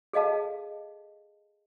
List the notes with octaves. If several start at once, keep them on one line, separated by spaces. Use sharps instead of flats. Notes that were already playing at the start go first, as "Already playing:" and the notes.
G#4 A4 D#5 F5 A5